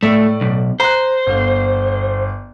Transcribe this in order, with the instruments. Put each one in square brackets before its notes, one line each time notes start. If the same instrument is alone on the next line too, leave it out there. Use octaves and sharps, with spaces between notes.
[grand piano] A2 D5 E6 [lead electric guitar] A3
[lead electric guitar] B1
[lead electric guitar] C5 [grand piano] A#5 F#6
[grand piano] G1 F5